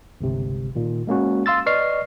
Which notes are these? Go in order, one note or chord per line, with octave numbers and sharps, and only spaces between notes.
G1 C#2 C3
A#2 D#3
G#3 A#3 C#4 F#4
F5 C6 E6 A6
B4 D5 D#5 C#6 F6 C7